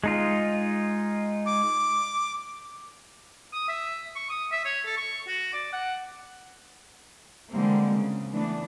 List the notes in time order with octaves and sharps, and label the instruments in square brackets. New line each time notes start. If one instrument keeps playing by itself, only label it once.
[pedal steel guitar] G#3 D#4 F4
[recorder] D6
[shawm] D#6
E5
C#6
D#6
E5
C#5
A4
C#6
F#4
D5
F#5
[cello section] D3 E3 G3 G#3 A#3 C4
C#3
E3 A3 B3 D4